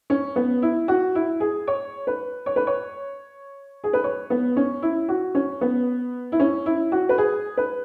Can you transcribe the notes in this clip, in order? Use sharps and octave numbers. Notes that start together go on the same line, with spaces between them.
C#4
B3
E4
F#4
E4
G#4
C#5
B4
C#5
B4
C#5
G#4
B4
C#5
B3
C#4
E4
F#4
C#4
B3
E4
C#4
E4
F#4
B4
G#4
B4